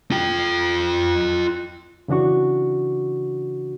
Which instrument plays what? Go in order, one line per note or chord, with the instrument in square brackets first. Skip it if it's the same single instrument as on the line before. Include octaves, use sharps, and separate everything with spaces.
[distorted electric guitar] F4 G5
[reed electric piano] C#3 E3 D4 F#4 C#6